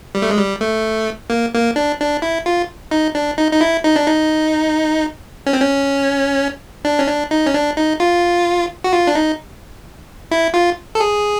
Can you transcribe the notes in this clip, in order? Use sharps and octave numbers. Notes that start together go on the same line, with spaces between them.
G3
A3
G#3
G3
A3
A#3
A#3
D4
D4
E4
F4
D#4
D4
D#4
D#4
E4
D#4
D4
D#4
C#4
C4
C#4
D4
C#4
D4
D#4
C#4
D4
D#4
F4
F#4
F4
D4
D#4
E4
F4
A4
G#4